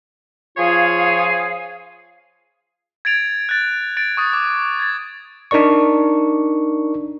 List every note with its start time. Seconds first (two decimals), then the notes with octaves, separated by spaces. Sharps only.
0.57 F3 F4 G#4 C#5 F5
3.05 G#6 A6 D7 F7
3.49 F#6 A6
3.97 A6 D7
4.17 C#6 D#6 A6
4.33 D6
4.79 G#6 A6
5.51 D4 D#4 A#4 D5 C#6